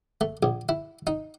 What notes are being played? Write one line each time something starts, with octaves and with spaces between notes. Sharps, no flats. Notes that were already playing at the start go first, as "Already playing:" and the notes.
A3
A#1
E4
D#4